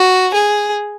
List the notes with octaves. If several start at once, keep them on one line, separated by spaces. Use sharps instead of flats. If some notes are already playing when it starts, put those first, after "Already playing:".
Already playing: F#4
G#4